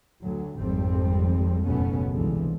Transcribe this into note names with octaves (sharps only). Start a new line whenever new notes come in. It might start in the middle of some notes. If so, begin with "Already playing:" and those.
D2 F#3
G#1 F2 G#2 G3 C4
F#1 D#2 B2 A3 B3 C#4
C2 G2 D3 E3 F3 G#3